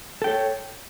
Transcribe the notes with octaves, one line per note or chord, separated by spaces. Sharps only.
A4 C#5 G5